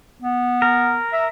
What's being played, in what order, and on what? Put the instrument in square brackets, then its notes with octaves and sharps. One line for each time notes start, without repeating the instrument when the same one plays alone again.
[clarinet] B3
[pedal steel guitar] A#4
[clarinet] E5